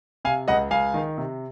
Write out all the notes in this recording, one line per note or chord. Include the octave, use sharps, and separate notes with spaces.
C3 F5 G#5
C#2 D#5 F#5
C#2 F5 G#5
D#3
C3